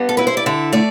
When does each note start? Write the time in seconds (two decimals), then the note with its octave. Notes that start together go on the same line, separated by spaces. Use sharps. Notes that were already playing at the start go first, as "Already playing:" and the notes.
Already playing: G2 B3
0.09 A4
0.17 E4 B4
0.27 C5
0.37 D5
0.46 D3 E5
0.73 A3 D5